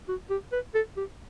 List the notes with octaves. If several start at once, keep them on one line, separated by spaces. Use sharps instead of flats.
F#4
G4
B4
A4
G4